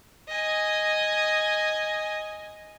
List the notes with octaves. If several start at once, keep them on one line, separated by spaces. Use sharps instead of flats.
D#5 G#5